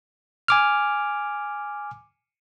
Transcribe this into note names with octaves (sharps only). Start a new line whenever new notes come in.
G#5 D6 F6